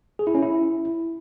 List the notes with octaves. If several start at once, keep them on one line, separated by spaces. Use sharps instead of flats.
G#4
E4
C#4
E4